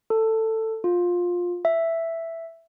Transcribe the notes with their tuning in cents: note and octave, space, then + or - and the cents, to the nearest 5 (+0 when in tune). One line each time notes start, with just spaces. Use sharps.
A4 +15
F4 +15
E5 +5